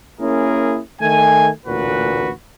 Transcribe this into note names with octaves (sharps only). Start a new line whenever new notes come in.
A#3 C#4 E4 G#4 A#4
D#3 A3 G#5
A1 D2 A#2 F#4 B4